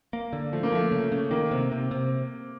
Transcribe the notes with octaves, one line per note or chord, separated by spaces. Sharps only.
A#3
D3
F3 A3
A#3
F3 A3
C#3
C#3
D#3 A#3
C3
C3
C3